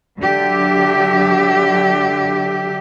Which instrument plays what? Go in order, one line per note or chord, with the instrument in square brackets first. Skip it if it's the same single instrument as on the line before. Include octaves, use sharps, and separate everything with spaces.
[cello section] D3 F#3 G4 E5